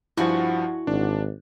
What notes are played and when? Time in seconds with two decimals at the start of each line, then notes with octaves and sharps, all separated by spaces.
0.17 G2 F3 E4 F#4 G#5
0.87 G#1 D4